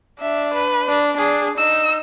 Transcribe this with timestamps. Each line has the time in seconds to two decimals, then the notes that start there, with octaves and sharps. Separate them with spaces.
0.21 D4 E5
0.54 B4
0.88 D4
1.18 D4 G#4
1.58 D#4 E6